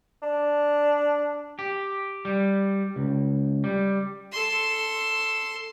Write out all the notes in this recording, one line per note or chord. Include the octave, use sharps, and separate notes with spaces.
D4
G4
G3
C#2
G3
A4 C6